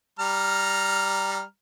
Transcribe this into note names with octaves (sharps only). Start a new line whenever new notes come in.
G3 A#5 F6